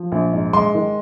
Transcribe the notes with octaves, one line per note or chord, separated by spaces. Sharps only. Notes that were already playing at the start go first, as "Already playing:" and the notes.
Already playing: F3
A#1
G#2
G#3 C6
D#3